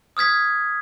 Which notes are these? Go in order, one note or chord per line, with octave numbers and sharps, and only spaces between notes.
D#6 F6 G#6 B6